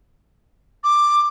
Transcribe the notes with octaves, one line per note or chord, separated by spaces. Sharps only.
D6